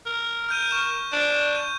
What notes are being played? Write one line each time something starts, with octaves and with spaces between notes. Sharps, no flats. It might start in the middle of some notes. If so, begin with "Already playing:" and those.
A#4
F6 G6 D#7
C#6 F6 E7
D4
G6 D#7